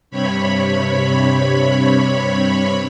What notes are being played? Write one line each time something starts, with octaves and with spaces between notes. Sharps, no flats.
G2 C3 C#5 B5